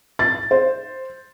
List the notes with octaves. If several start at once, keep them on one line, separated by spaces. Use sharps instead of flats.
A6
C5